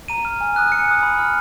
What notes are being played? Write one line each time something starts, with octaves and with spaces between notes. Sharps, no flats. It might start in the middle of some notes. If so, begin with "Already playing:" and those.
A#5 D#7
F6
G#5
D#6 F#6
G#5 C#7
D#6 F#6
B5
F6